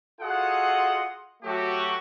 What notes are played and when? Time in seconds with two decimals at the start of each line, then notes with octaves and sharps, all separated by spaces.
0.21 F4 F#4 G#4 A4 D#5 F#5
1.43 F#3 A3 F#4 G4